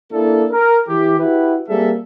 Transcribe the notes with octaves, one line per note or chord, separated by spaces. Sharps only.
A#3 D4 E4 A4
A#4
E3 G4
E4 F#4 G4 B4
G3 A#3 C4 G#4 A4 E5